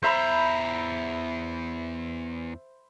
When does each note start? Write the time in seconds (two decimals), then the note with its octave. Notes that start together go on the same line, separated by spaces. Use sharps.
0.03 E2 C5 E5 A#5 B5